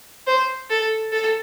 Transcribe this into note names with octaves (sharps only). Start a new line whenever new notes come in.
C5
A4
A4